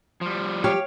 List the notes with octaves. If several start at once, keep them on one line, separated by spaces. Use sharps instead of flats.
F3 G3
G4 C#5 F5